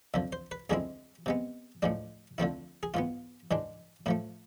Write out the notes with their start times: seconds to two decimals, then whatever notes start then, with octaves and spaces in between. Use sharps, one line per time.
0.14 F2 D3 F3 E5
0.32 C5
0.51 B4
0.70 F2 D3 G#3 C4 E4 G#4
1.26 C3 G#3 B3
1.82 A2 F3 G#3 D4
2.38 D3 F3 A3 C4 E4
2.83 G#4
2.94 G#2 E3 B3 F4
3.51 G#2 E3 G#3 D4
4.06 A2 F3 A3 E4